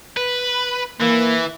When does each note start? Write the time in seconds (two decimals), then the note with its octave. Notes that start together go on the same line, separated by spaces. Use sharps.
0.17 B4
1.00 E3 A#3